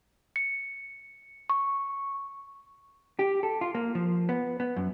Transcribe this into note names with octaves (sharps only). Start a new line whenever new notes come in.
C#7
C#6
G4
A4
F4
A#3
F3
B3
B3
F#2